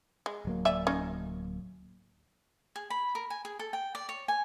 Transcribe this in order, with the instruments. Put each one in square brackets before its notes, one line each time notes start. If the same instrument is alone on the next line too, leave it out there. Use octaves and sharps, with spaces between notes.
[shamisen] G#3
[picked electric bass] D1 F#3 A#3
[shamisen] D5 E5 G#5
C#4 D#4
[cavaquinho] G#4
B5
A#4
G#5
G#4
A4
G5
D5
C#5
G#5